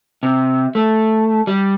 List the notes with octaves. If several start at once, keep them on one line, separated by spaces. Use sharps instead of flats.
C3
A3
G3